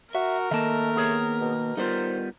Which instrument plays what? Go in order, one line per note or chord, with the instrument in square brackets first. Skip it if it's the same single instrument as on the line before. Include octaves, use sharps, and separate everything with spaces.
[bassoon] F#4 [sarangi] A#4 [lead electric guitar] E5
[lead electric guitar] D#3 A#3 [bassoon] A3 [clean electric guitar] D#5 A5
[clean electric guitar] B3 G#4 C#5
[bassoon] B2
[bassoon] D#3 [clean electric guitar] G3 B3 F4 [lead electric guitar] D#4 C5